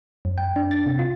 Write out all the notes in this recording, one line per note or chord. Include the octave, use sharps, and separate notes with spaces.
F#2
G5
D4
A6
C3
F4